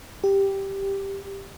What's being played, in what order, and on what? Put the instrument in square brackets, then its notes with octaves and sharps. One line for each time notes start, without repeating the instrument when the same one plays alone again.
[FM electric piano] G4